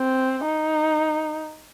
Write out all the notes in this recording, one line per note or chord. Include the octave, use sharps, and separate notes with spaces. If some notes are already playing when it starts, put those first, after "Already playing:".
Already playing: C4
D#4